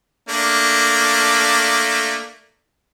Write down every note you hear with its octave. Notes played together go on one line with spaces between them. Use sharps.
A3 A#3 D4